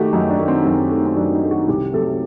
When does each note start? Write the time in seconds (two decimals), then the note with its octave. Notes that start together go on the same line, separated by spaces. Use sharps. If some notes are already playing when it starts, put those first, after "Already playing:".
Already playing: D#3 A3 F#4 G4
0.13 F#2 D#4
0.30 D4
0.39 D#3 A3
0.48 C4
0.65 F#2
0.91 D#3 A3
1.05 C4
1.16 F#2 D4
1.33 D#4
1.42 D#3 A3
1.51 F#4
1.68 C2 G4
1.93 C3 F#3 A3 A4
2.10 A4